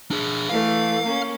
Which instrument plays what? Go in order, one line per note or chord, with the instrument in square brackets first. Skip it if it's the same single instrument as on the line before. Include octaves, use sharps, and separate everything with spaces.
[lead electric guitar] D4 G#4
[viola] E3 A3 [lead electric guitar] F5
[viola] A#3 C#4